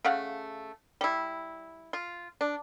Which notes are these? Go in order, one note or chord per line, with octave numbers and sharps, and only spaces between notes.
C#3 A3 F5 F#5
G3 E4
F4
D4